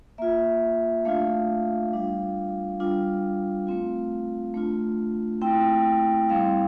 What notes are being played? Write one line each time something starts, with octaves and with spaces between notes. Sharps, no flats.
A#3 F4 E5
A3 D4 F4 F5
G3 D4 F4
G3 D4 F4
A3 C4 F4
A3 D4 F4
A3 C4 E4 G5
G3 C4 E4 F5